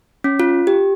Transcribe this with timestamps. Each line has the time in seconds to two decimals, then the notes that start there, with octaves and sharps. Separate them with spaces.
0.24 C#4
0.40 F4
0.67 G4